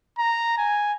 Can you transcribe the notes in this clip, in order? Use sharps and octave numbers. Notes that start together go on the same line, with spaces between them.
A#5
G#5